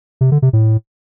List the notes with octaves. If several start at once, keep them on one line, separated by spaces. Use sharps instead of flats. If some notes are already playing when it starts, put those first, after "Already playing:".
C3
D3
C3
A2